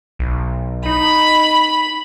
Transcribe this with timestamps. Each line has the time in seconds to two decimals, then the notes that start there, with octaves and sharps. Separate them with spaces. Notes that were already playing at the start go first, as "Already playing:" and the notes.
0.19 B1
0.86 D#4 B5